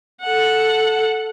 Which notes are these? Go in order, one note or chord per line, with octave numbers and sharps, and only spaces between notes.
A4 F#5